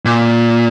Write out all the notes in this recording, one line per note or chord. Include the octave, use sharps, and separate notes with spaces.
A#2